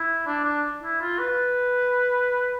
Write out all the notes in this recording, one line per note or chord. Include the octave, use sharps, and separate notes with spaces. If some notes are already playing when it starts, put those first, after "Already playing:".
Already playing: E4
D4
D4
E4
F4
B4